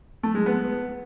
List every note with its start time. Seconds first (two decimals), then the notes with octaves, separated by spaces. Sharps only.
0.23 A3
0.35 G#3
0.46 B3